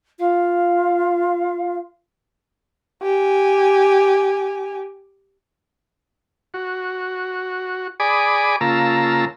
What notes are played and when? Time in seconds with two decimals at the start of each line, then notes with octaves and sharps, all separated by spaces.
0.19 F4 F5
3.02 G4 G#5
6.54 F#4
8.00 G#4 D5 G#5 B5 D6 D#6
8.61 C#3 A#3 F4 A5 A#5 E6